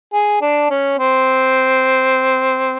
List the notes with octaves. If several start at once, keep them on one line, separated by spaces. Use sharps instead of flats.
G#4
D4
C#4
C4